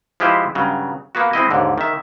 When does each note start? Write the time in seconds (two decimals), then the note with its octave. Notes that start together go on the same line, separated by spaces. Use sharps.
0.20 F3 G#3 E4 G4 B4 C5
0.55 G2 C#3 F#3
1.15 A#3 B3 F#4
1.33 G#3 C4 E4 D#5
1.51 D#2 G#2 D3
1.78 D#3 E5